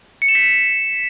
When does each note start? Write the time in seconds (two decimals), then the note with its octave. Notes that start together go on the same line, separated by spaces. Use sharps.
0.22 C#7
0.28 E7
0.35 B6